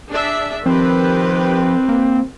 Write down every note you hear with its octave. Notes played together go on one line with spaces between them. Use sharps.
D4 G#4 E5
D#3 F3 C4 G4 B4
A#3